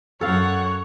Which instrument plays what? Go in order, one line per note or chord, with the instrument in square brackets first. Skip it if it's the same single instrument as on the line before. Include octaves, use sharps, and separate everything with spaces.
[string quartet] F#2 F#5 [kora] A4 F5 [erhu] C#5